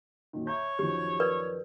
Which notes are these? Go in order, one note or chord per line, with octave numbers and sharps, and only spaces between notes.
F#2 A#2 D#3
C#5 E5 A#5 G6
F#2 D#3 F3 G4
A#4 B4 D5